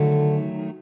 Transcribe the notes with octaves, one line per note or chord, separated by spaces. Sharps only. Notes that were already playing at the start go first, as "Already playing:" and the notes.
Already playing: D3 D#3 F#3 A3